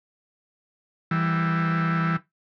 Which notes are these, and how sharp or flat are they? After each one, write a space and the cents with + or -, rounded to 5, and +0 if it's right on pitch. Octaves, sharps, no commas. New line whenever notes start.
E3 +0 G3 +0